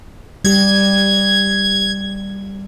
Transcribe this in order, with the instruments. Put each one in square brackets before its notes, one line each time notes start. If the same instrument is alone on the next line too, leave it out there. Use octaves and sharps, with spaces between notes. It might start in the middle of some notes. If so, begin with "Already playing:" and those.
[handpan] G3 G4 [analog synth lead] G#6